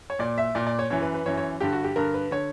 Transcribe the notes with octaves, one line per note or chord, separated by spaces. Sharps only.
C#5
A#2 D5
E5
A#2 D5
D5
C#5
F#2 E3 C#5
B4
B4
F#2 E3 C#5
C#5
G2 D3 G4
F#4
G4
G2 D3 A#4
B4
D3 C#5